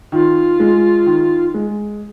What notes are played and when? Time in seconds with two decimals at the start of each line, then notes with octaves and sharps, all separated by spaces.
0.12 D#3 F4
0.60 G#3
1.06 D#3
1.54 G#3